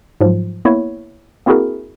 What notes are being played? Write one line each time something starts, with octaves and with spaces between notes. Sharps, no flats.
G#2 F3 F#3
A#3 B3 E4 C#5
A#3 C4 E4 F#4 G#4 A#4